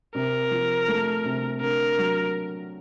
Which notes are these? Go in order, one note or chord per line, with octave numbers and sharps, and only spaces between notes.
C3 A#4
F3
A3
C3
D3 A#4
F#3